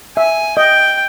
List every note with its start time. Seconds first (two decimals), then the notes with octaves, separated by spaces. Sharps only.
0.17 E5 G#5
0.57 D#5 G5